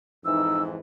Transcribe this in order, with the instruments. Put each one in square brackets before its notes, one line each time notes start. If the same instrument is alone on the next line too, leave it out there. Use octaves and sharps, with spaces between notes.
[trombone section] F2 G#2 E3 [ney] D#4 [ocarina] E6